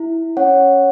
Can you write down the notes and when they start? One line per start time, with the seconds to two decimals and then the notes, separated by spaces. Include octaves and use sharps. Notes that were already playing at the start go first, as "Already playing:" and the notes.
Already playing: E4
0.37 C#4 C#5 F#5